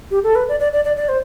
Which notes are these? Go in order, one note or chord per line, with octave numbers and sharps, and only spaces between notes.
G4
A4
B4
D5
D5
D5
D5
D5
C5